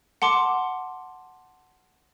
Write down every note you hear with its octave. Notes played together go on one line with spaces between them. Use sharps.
F#5 A5 C6 D6